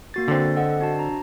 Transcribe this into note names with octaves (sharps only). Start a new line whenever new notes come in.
A#3 F#4 A6
D3 C4
A4 D#5 F#5
D4 F#4 A5
A#5